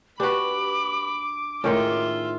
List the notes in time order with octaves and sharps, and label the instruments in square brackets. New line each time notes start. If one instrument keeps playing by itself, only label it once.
[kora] D4 F#4 [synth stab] G4 B4 [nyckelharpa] B5 [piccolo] D6
[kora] A2 D#3 G#3 [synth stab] C#4 [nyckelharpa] F4 E5